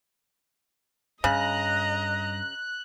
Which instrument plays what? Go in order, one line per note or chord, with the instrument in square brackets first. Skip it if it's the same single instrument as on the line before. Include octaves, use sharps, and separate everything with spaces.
[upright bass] G2 [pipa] C#3 [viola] D#5 A#5 [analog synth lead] F#6